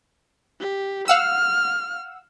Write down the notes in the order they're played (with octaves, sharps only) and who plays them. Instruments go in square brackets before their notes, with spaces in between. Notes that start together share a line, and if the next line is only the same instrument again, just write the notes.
[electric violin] G4
[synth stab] F5 F#5 E6 [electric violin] F6